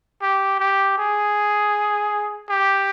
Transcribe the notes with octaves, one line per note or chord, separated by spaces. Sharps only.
G4
G4
G#4
G4